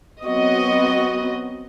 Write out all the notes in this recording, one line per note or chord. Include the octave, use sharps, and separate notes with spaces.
F#3 B3 C4 F#4 D#5